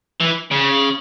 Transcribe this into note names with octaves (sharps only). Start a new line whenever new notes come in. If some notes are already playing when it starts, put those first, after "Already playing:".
E3
C#3